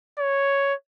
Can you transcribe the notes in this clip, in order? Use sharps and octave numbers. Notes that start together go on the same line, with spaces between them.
C#5